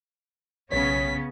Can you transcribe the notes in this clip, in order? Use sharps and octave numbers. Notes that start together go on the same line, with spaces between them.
B1 C#3 B3 C#4 C#5 B6